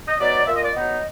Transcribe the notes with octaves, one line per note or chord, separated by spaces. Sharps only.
D#5
F#3 B3 D#4 D5
A#2 E5
D#5
D5
D#5
F#3 B3 D#4